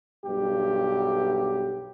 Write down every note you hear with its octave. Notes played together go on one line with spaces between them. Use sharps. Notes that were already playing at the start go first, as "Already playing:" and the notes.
B1 G2 G4